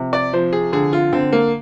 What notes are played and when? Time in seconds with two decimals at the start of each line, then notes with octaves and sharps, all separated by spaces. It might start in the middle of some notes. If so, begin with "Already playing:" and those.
Already playing: C3 F3
0.13 D5
0.33 F3 C5
0.53 G#4
0.72 D3 G#4
0.93 F4
1.12 D3 C4
1.32 A#3